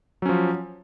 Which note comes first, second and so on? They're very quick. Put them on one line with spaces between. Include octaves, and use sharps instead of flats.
F#3 C#4 F3